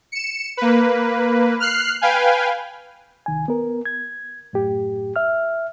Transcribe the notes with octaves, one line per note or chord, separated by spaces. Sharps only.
C#7 E7
A#3 B4
F6 F#6 C7
B4 F5 G5 G#5
C2 D#3 G#5
B3 A#4
G#6
F#2 A2 G4
E5 F6